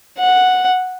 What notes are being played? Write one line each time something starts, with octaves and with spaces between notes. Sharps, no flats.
F#5